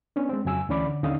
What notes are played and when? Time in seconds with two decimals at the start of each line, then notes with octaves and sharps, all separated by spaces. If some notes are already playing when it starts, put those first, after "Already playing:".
0.16 B3 C#4 D4
0.29 G#3 C4
0.45 F2 C#3 F#3 G#5 E6
0.69 D2 E3 C#4 D5 B5 D6
0.86 D3
1.03 D#2 D3 C#4 D#4 F5 D#6